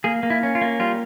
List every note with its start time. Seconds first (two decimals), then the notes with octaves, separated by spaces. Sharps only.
0.04 A#3 G#4
0.23 A#3
0.30 E4
0.43 C#4
0.55 F4
0.62 A#3
0.80 G3 F4